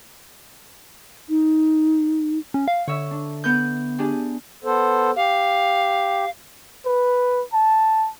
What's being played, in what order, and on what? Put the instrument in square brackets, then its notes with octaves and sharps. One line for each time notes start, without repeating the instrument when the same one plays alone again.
[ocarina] D#4
[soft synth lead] C#4
F5
[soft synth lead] D3 [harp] C#5 E5
[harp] D4
B3 B4 G6
D4 G4 G#4
[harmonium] B3 A4 C5
[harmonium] G4 [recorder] F5
[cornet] B4
A5